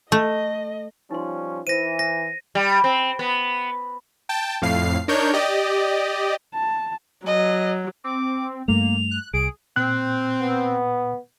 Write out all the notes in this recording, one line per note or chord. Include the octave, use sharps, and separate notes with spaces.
A3 D#5
F3 G3 C#4 D#4 C6
E3 C5 A#6 D#7
A#6
G3
C4
B3
G5 A5
F2 A2 F5 C7
D4 D#4 A#4 C#5 G6
G4 D5 D#5
A5
F#3 D#5
C4 D6
G2 A3 A#3 F7
F#6
C2 G#4 D7
A#2 C4 F#6
B3